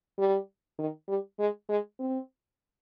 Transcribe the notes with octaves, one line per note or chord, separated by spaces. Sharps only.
G3
D#3
G3
G#3
G#3
C4